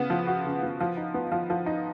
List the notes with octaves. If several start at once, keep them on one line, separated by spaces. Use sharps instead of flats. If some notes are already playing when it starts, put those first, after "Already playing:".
Already playing: C#3 B3
F3
F#4
C#3
B3
F3
D#4
B3
F3
F3
D#4